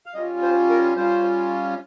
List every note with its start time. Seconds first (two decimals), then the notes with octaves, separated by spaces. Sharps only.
0.06 F5
0.14 G3 C#4 F4 D#5
0.42 C5
0.70 A#4
0.96 G3 C#4 F4 C5